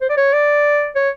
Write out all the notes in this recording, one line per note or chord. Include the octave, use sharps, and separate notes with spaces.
C5
D5
C#5
D5
C#5